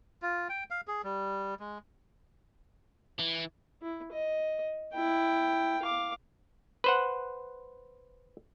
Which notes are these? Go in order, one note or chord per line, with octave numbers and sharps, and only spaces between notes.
F4
G5
F5
G#4
G3
G#3
E3
E4
D#5
E4 G5
F5 D6
B4 C5 F#5